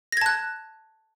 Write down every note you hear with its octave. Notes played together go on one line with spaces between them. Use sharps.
A5 F#6 G#6 A#6